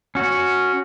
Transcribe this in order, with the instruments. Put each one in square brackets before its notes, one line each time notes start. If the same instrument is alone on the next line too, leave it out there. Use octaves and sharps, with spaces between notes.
[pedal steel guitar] C#4 F#4